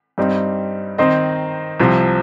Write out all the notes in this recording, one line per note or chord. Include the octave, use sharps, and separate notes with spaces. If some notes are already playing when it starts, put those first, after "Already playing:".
G2 G3 C4 D#4
D#3 C4 D#4 C5 D#5
C2 C3 F3